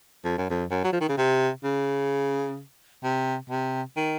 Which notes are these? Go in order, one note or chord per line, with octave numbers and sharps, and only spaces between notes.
F2
F#2
F2
F#2
F#3
F3
D#3
C#3
C3
C#3
C3
C3
D#3